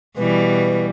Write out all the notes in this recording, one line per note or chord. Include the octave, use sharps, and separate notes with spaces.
B2 E3 G3 B4